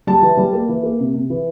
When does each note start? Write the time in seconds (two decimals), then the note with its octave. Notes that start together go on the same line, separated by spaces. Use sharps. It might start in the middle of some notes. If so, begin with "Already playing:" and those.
0.07 G3 A5
0.22 E3
0.37 G3
0.53 A#3
0.69 E3
0.83 A#3
1.00 C3
1.14 C3
1.30 E3